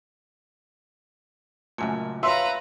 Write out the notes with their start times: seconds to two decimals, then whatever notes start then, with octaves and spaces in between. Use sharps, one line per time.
1.78 C#2 F#2 A#2 A3 G#5
2.23 F4 B4 C#5 E5 F5 A#5 C6